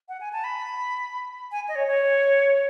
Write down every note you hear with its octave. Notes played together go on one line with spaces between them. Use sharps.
F#5
G#5
A5
B5
G#5
D#5
C#5
C#5